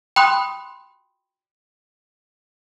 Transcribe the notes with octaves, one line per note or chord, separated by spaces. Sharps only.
G5 B5 C6 D#6 F#6